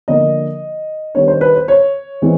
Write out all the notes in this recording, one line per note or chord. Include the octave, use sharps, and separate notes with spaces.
D3 F3 A#3 D4 D#5
D#3 G3 B3 D4 C#5
C5
B4
C5
C#5
E3 G#3 C4